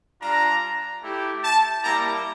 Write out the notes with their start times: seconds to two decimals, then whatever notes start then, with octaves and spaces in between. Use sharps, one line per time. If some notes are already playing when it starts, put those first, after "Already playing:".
0.20 G3 D4 F4 A#5
1.02 A3 E4 G4
1.44 A5
1.84 G3 A#3 E4 G4 A#5